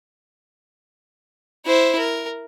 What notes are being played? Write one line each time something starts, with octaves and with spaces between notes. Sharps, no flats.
E4 C5
A#4